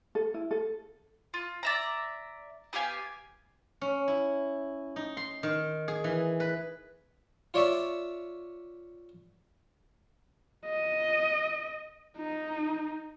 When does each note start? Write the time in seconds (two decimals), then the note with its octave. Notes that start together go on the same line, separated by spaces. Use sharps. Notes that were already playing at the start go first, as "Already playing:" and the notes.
0.15 A4
0.34 E4
0.51 A4
1.34 F4
1.63 D5 E5 A#5
2.73 B3 G4 F5 G#5
3.81 C#4
4.08 E4
4.96 D#4
5.17 C6
5.43 D#3
5.88 G#4
6.04 E3
6.40 B4
7.54 F4 C#5 D5 E5 C#6
10.65 D#5
12.17 D#4